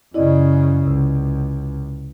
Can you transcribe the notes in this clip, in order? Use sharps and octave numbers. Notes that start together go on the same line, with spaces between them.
F#2 C#3 E4 D5 D#5
C#2 C3